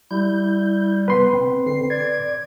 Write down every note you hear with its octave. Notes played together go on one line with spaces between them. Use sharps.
G3 E4 G6
C3 B3 B4 C6
C4
D3 C4 C7
D5 G#6